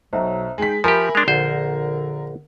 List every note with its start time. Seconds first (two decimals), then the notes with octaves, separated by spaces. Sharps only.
0.13 B1 B2 F#3 C5 E5 A#5
0.58 G#3 D#4 G5 G#5 B6
0.84 F3 G4 A#4 E5 G#5 B5
1.15 G#3 D4 C6 F7
1.28 A#1 D3 C5 F#5